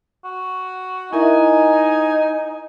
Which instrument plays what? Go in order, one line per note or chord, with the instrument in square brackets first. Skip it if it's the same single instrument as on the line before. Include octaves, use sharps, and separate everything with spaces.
[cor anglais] F#4
[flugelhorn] D#4 [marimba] E4 A#4 E5 [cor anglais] G#5